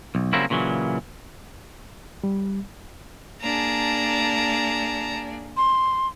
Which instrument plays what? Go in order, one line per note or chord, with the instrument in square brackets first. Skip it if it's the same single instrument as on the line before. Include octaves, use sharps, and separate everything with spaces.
[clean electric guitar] B1
C#3 F#3 G3 A#3 C4 E4
A#2 C#3 E3 F#3
[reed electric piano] G3
[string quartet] A#3 D4 G#4 [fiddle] A5 A#5
[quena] C6